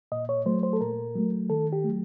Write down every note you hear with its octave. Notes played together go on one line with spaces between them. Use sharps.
A#2 D#5
C#5
F#3 A3 C5
C5
A4
A#2 A#4
F#3 A3
D#3 A4
G4
F#3 A3